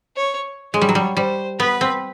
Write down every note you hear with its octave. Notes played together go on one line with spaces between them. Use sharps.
C#5
G#3 C#5
G3
F#3
G3
G3 C5
B3 B4
C4